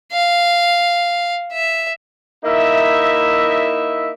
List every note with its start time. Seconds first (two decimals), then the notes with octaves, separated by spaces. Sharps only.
0.12 F5
1.53 E5
2.43 A#3 D#4 E4 E5